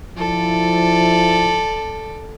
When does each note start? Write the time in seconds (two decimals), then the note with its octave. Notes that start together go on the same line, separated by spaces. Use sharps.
0.18 F3 E4 A4 D5